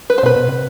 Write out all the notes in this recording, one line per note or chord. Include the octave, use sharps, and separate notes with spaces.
B4
C5
B2 B4
B2
C3